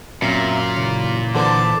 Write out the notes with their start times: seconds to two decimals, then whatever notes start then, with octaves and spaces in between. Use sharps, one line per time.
0.22 F#2 A#2 C4 E5 F5
0.77 C#3 E3
1.35 D3 E3 A4 C5 A5 D6